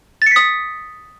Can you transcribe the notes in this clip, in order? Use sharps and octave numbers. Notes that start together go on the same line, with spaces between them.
D#6 A6 B6 C#7